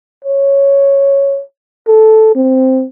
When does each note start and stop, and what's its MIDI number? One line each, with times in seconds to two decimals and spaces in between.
0.25 1.41 73
1.87 2.35 69
2.35 2.85 60